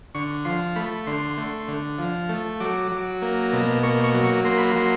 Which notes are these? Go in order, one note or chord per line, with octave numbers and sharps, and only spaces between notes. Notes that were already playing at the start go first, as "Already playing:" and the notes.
D3 C#6
F3 C6
A3 B5
D3 C6
A3
D3
F3
A3
F#3 D6
F#3
A#3
B2
A#3 C#6
C#6
F#3
C#6
A#3 C6
B5
F#3 C6